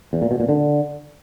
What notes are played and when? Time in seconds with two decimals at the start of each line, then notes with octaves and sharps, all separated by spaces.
0.13 E2
0.22 A#2
0.31 B2
0.40 A#2
0.49 D3